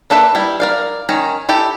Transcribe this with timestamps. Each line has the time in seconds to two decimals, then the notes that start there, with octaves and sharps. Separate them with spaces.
0.10 A#3 D4 A4 B4 E5
0.35 G3 E4
0.60 A#4 D5 F5
1.09 D#3 C#4 A#5
1.49 E4 G4 A4